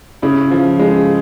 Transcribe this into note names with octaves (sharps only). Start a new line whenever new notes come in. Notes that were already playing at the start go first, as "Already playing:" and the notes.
C#3 E4
F3
G#3